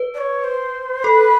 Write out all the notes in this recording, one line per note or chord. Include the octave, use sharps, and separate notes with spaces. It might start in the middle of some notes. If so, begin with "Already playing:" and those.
Already playing: B4
D5
C#5
C5
A4 B4